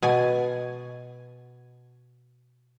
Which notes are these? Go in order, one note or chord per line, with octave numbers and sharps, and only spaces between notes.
B2 G#5